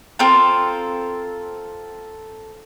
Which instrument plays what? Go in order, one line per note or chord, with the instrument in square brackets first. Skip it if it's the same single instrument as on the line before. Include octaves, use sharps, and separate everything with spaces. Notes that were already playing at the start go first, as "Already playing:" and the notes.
[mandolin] C4 F4 A4 A#4